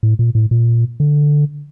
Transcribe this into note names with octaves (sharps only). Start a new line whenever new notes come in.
A2
A#2
A2
A#2
D3